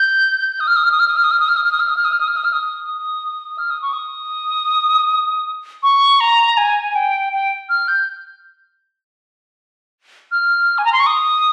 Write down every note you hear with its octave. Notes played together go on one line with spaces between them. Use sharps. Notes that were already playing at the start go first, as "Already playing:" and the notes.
Already playing: G6
D#6
F6
D#6
F6
D#6
F6
D#6
F6
D#6
F6
D#6
F6
D#6
F6
D#6
F6
D#6
F6
D#6
F6
D#6
F6
D#6
F6
D#6
D#6
F6
D#6
C#6
D#6
C#6
A#5
G#5
G5
G5
F6
G6
F6
G#5
A#5
C6
C#6
D#6